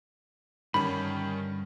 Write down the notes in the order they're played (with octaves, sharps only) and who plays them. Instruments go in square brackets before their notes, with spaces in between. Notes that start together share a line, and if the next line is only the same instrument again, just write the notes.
[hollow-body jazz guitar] G2 D3 [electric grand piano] D#3 C#4 [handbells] B5